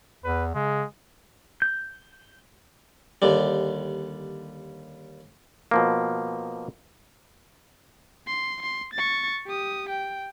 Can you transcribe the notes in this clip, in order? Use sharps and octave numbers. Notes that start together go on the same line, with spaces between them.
E2 B4
C#3 G#3
G6
D#2 D3 G3
B2 F3 A#3
C6
C6
C#6 A6
G4 D#6
G5